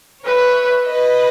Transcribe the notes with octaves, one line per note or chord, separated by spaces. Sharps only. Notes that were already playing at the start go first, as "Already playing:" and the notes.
B4 C#5 E5
B4 D#5